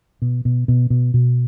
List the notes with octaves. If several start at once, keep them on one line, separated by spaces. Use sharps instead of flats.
B2
B2
B2
B2
B2